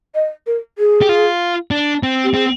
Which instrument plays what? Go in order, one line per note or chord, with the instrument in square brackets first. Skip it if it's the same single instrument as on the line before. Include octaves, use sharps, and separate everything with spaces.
[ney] D#5
A#4
G#4
[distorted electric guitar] G4
F4
D4
C4
[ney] G4
[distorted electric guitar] C4 [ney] G#4